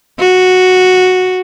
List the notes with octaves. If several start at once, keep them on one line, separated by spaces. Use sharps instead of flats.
F#4